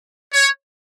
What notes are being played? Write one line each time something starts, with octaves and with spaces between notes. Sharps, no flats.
C#5